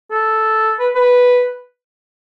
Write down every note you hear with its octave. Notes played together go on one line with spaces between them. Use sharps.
A4
B4
B4